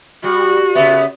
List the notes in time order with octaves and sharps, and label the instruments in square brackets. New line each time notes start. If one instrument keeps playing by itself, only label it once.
[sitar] G3 [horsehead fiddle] F#4
[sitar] C#3 B3 [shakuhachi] E5